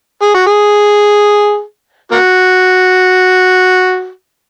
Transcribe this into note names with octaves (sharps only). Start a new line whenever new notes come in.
G#4
F#4
G#4
A#3 F#4